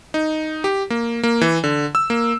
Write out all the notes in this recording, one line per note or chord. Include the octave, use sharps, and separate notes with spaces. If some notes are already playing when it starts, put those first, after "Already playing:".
D#4
G4
A#3
A#3
E3
D3
E6
A#3